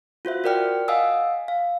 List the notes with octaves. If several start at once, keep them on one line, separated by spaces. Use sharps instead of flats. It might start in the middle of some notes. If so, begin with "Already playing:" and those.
F4 F#4 C5 E5
F#4 A#4 D5 G5 F6
D#5 F5 F#5 G#5 D#6 E6
F5